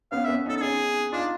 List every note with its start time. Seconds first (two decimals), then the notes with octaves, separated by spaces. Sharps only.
0.12 B3 C#4 F5
0.24 B3 C#4 E5
0.46 C#4 D#4 A4
0.57 A4
0.62 C#4 D#4 G#4
1.12 D4 D#4 F4